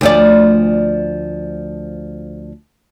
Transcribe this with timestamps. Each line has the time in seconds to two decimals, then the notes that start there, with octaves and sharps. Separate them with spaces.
0.01 D2 F3 D5